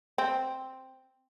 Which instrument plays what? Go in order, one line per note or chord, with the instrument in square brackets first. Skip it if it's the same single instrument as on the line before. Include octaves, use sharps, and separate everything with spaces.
[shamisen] C4